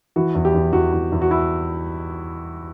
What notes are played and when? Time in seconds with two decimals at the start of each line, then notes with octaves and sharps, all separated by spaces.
0.16 E3 F#4
0.35 E2
0.45 G4
0.54 E2
0.73 E2 F#4
0.93 E2
1.12 E2
1.22 F#4
1.31 E4